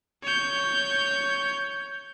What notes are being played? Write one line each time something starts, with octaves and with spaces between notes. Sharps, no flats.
C#5 G6